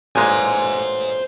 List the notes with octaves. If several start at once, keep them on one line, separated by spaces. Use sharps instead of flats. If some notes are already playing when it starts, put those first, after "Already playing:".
A1 A#2 G#3 C5 G#5